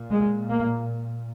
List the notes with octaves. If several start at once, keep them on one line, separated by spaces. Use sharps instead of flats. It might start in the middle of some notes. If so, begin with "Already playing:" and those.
Already playing: A#2
G#3
A#3